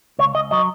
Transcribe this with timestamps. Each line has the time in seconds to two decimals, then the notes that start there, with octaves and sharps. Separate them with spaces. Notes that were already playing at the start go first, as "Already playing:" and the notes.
0.19 C#2 C#5
0.35 C#2 D#5
0.51 F#3 D#5